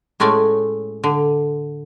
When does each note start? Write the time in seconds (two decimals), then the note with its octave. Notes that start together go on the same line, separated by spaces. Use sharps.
0.20 A2 G#3 A3 C#4 D5 G#5
1.04 D3